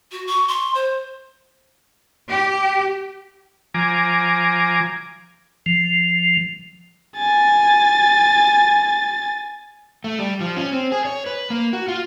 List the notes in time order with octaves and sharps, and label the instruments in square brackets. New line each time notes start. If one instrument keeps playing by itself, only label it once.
[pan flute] F#4
C#6
C6
C5
[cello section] G4
[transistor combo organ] F3 G#5 A#5 D6
[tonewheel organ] F3
[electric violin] G#5 A6
[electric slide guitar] A3
G3
F3
C#4
C4
G#4
C#5
B4
A#3
F#4
F4